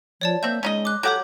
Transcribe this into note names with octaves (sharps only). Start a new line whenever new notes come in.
F3 C#5 D5 A5
A#3 C4 E5 G6
G#3 C#4 D#4 D#5
D6 F#6
F#3 G4 A4 C#5 F#5 D6 G6